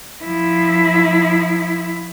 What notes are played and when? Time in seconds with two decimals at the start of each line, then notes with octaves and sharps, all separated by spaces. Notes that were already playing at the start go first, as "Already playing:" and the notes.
0.23 F3 E4